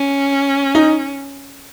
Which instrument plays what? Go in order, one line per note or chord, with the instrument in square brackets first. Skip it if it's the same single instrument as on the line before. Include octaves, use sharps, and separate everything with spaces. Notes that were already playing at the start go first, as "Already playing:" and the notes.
Already playing: [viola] C#4
[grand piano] D#4